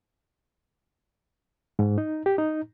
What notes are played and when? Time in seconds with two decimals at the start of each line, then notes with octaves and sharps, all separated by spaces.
1.79 G#2
1.98 D#4
2.26 G4
2.38 D#4